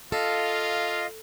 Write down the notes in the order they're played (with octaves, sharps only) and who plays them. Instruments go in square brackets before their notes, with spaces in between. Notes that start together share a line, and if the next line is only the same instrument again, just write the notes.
[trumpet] F4 [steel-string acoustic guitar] A4 [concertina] D#5 F5